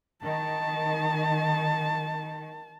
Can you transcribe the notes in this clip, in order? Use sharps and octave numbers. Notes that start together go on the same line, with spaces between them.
D#3 A5